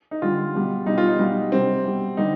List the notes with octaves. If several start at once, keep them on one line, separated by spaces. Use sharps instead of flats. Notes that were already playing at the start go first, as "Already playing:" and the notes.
D#4
D3 G3 F4
B2 G3
B2 G3 D#4
F4
D#4
B2 G3
C3 G3 C4
B2 G3
D3 G3 D#4